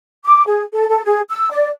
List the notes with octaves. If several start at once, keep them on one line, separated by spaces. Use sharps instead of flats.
D6
G#4
A4
A4
G#4
E6
D5